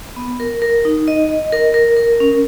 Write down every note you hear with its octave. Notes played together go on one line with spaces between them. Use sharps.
B3
A#4
A#4
D#4
D#5
D#5
A#4
A#4
A#4
C#4